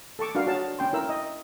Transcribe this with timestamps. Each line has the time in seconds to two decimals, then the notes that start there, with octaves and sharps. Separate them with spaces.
0.19 A4 A5 C#6 D6
0.35 D4 F#4 A#4 F5
0.47 F#4 G#4 C#5 A5
0.79 C#4 G5 C6
0.93 E4 A#4 E6
1.09 D#5